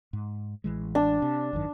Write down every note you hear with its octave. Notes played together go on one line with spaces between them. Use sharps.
G#2
A1 E3 G#3
D4
C3
G#1 F#2 D#3